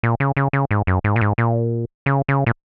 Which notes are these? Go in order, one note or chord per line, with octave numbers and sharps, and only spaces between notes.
A#2
C#3
C#3
C#3
G#2
F#2
G#2
A#2
G#2
A#2
C#3
C#3
A#2